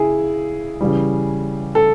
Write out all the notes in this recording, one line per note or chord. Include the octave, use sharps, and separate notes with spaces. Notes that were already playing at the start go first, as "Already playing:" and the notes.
Already playing: C#3 E4 G#4
C#3 E3 G3
A4